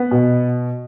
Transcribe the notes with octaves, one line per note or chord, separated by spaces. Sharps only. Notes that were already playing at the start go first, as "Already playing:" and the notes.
Already playing: B3
B2